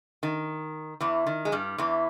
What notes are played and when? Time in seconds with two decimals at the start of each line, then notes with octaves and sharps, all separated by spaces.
0.23 D#3
1.01 E2 E3
1.27 D#3
1.45 G#3
1.52 G2 G3
1.78 E2 E3